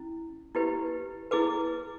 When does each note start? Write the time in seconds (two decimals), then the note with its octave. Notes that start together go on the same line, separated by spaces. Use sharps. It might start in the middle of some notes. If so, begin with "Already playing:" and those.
Already playing: C#4 E4
0.55 E4 G4 B4
1.31 E4 G#4 B4 D6